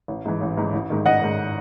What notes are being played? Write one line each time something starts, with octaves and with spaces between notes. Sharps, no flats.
A1
G#2 E3
A1
G#2 E3
A1
G#2 D#3
A1 D#5 F#5
G#2 D#3